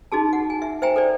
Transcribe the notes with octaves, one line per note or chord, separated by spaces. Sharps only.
D#4 F#4 G#4 A5
F#5
G#5
E5
C5 E5 G5 G#5 A#5
A4 C5 D5